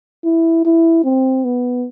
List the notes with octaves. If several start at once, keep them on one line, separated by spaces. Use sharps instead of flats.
E4
E4
C4
B3